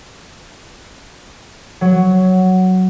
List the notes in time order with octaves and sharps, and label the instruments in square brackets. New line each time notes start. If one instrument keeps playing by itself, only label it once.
[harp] F#3